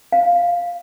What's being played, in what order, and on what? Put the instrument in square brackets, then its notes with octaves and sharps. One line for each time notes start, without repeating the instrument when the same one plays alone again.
[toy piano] F5